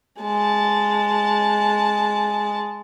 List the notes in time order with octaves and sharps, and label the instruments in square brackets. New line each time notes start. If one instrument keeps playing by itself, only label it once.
[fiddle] G#3 A5